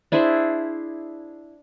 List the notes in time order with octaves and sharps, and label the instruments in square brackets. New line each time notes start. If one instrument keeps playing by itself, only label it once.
[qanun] D4 E4 G#4 C5